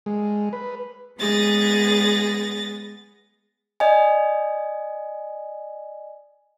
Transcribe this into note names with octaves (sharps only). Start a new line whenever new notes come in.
G#3
B4
G#3 B3 G#4 A6 A#6
D5 D#5 G#5